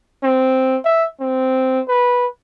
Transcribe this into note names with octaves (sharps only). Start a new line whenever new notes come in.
C4
E5
C4
B4